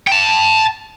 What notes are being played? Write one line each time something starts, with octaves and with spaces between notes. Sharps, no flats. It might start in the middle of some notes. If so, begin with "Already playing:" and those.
G5 A5